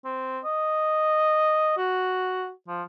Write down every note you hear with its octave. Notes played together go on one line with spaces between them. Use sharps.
C4
D#5
F#4
F3